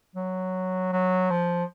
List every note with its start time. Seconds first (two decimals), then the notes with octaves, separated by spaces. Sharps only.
0.15 F#3
0.92 F#3
1.30 F3